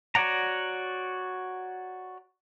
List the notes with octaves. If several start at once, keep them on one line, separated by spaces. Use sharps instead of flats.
F#4 C#5 D5 F#5 A#5